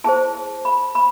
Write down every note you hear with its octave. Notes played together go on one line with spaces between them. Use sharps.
E4 G#4 C5 A5
B5
B5